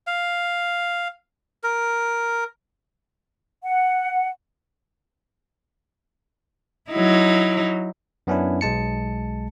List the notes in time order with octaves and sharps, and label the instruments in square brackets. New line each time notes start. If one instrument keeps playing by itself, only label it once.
[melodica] F5
A#4
[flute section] F#5
[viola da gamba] F#3 D#4 E4
[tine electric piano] F#2 B3 C#4 D4 E4
B1 G#3 A5 C#7